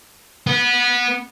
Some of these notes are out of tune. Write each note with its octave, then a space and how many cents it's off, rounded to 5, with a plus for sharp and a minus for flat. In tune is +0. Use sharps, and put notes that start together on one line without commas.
B3 -20